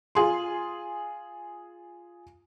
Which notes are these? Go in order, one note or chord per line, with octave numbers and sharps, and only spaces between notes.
F4 G#4 C6